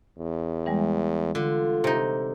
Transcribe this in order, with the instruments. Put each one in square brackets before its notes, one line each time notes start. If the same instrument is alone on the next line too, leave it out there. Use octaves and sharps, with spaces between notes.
[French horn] E2
[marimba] E3 G3 G#3
[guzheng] D3 [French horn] F4
[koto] C3 D#4